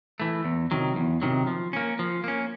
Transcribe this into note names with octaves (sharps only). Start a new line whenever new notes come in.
E3 A3
E2
C3 D#3 F#3
E2
C3 D#3 F#3
F3
A#3 C#4
F3
A#3 C#4